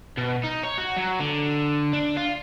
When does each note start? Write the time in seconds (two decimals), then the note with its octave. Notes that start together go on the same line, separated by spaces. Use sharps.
0.17 B2
0.44 D#4
0.63 C#5
0.78 F#4
0.97 F#3
1.20 D3
1.93 D4
2.17 F4